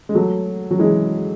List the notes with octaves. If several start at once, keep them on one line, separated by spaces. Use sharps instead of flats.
G#3
F#3 A3
F#3
E3 G#3